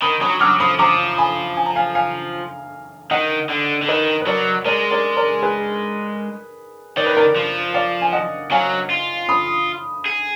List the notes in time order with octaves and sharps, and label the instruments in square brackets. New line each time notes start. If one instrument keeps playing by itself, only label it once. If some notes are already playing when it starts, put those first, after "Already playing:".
[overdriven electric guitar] D#3 [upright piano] B5 D#6
[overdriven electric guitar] F#3 [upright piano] B5 D#6
[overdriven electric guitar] F#3 [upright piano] D6 F6
[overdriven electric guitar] F3 [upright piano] B5 D#6
[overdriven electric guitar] F3 [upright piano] A#5 D6
[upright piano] G#5 B5
G#5
A#5
F5 G#5
F5 G#5
[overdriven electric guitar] D#3 [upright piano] D#5 F#5
[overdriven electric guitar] D3
D3
[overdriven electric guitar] D#3 [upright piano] B4 D#5
[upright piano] B4
[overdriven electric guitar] F#3 [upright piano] A#4 D5
[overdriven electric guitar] G#3 [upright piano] A#4 D5
[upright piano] A#4 D5
A#4 D5
G#4 B4
[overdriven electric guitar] D#3 [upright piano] D5
[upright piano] B4
A#4 D5
[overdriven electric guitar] F3
[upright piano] D5 F5
G#5
D#5 F#5
[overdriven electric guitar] F#3 [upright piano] F5 G#5
[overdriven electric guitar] F4
[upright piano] B5 D#6
[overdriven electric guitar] G#4